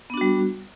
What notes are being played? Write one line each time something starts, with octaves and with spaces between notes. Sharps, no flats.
G3 B3 D4 F#4